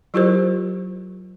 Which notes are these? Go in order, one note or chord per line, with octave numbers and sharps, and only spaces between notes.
F#3 E4 F4 G4 A#4 C5